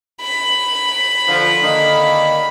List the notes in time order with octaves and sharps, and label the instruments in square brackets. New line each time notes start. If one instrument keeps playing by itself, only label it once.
[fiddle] B5
[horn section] D3 F3
D3 D#3 A#3